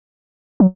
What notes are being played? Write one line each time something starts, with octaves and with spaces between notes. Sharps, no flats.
F#3